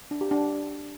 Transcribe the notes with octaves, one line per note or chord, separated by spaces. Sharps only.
D4
G4
D4